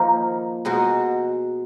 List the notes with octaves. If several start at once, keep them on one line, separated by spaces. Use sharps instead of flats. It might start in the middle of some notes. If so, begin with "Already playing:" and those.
Already playing: F3 A#3 D#4
B2 G#3 D#4 F#4